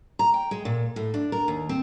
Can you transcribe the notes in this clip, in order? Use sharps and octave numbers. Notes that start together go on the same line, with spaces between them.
A#5
G5
G#3
A#2
A2
D4
A#4
D#2
C4